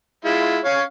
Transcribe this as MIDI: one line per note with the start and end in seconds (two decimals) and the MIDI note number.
0.25 0.59 56
0.25 0.59 64
0.25 0.59 65
0.65 0.83 61
0.65 0.83 73
0.65 0.83 77